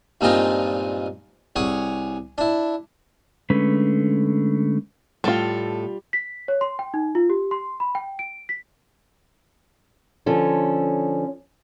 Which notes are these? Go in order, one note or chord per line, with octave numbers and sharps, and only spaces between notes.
G2 A#2 G#3 C4 D#4 F4
C2 G#4 C#5 F#5
D4 E4
D3 G#3 A3 C#4 B4
A2 G3 F4 A4
B6
C#5
C6
G5
D#4
F4
G4
C6
B5
G5
D7
B6
D3 F3 C#4 A4